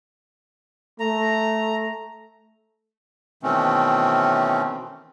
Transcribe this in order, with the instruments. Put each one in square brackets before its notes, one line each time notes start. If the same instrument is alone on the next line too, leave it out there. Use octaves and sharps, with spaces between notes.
[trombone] A3 [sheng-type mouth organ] A#5
[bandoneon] B2 D#3 E3 A3 C4 C#4